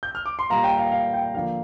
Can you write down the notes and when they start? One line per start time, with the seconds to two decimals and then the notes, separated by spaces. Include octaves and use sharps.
0.03 G6
0.15 F6
0.26 D6
0.39 C6
0.50 A#2 G3 A#3 F5 A#5
0.64 G5
0.78 F5
0.92 F5
1.13 G5
1.35 D3 F3 A#3 F5